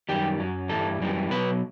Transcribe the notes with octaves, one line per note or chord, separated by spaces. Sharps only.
F#2 D#3 G3 G4
F#2 F#3
G2 E3 G3 A4
F#2 E3 G3
B2 F#3 B4